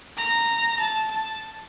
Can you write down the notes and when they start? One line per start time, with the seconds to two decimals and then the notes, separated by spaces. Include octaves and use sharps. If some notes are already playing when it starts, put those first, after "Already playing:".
0.17 A#5
0.79 A5
1.11 A5